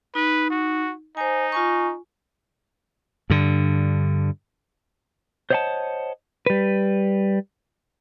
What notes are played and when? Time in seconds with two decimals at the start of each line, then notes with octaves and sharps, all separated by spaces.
0.15 D#4 B4
0.50 F#4
1.17 D#4 C5 G#5
1.52 F4 G#5 C#6
3.30 G2 D3
5.50 C5 C#5 D#5 F5 F#5 A5
6.46 G3 B4